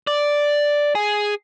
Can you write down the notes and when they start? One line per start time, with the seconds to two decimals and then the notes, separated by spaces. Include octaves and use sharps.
0.07 D5
0.95 G#4